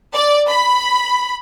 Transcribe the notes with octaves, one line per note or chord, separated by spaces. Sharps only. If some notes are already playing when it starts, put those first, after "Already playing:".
D5
B5